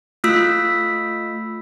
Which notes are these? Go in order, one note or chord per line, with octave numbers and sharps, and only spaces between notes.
A3 F4 E6 B6